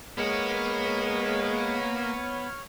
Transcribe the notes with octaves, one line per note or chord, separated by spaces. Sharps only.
G#3 A#3 B3 C#5 F6